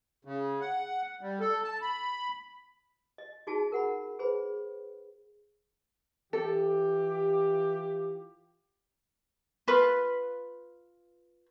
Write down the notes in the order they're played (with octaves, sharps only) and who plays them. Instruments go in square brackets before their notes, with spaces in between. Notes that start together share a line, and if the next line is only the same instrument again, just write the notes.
[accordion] C#3
F#5
G3
A4
A5
B5
[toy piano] D#5
D#4 F4 F#4 G#4 A5
A#4 F#5 B5
G#4 B4 C5 B5
[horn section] E3 F4 G4 [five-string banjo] A4
[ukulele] F4 B4